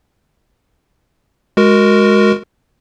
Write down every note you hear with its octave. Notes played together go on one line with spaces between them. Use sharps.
G#3 F#4 A#4